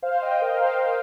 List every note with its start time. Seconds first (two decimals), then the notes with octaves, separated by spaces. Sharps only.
0.02 C5 F5
0.22 D#5 G5
0.42 A#4 D#5
0.61 C5 F5